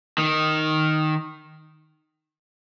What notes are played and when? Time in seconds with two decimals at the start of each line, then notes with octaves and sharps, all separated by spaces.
0.18 D#3